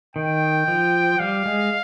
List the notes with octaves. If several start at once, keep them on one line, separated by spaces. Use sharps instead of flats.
D#3 G5
F3
G3 F5
G#3